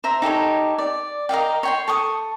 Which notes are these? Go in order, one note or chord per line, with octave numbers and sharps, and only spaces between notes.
C5 E5 A#5
D#4 G4 A4 C#5
D5
A#4 D#5 F5 G5
C#5 G5 C6
A4 C#6 D#6